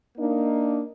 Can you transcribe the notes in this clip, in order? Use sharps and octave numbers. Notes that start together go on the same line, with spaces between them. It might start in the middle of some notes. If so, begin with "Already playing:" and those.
A#3 D4 D#4